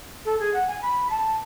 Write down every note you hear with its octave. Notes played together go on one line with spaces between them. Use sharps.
A4
G#4
F#5
G#5
B5
A5